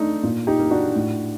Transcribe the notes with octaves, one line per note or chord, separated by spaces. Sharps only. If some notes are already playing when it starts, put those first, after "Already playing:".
Already playing: A3 D4 D#4
A#2
D#4 G4
A#3
D4 F#4
A2